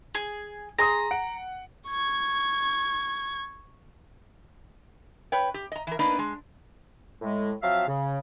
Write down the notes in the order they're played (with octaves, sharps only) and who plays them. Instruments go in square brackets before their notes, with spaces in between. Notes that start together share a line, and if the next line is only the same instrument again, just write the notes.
[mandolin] G#4
[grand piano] G#4 C6 D#6 [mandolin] A#5
[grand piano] F#5 D7
[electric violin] C#6 G#6
[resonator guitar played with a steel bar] B4 C#5 G5
G4
D#5 A#5
E3 A#4
A#3 B3 D4 D#4 B4
G#3
[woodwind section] A2 G#3
F3 F#3 C4 E5 F5
C#3